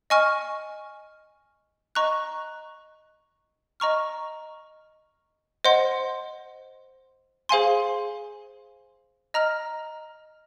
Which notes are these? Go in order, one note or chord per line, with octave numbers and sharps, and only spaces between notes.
D#5 G#5 C#6 F6
D#5 A#5 C#6 F#6
D#5 A#5 C#6 F6
C5 D#5 F#5 C6
G#4 C5 F5 G#5 C6
D#5 A#5 F6